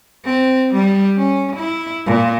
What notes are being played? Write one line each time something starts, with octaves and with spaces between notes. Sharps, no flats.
C4
G3
C#4
E4
A#2